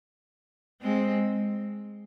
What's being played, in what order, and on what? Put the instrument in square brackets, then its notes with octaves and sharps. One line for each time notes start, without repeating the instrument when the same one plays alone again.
[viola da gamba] G#3 C4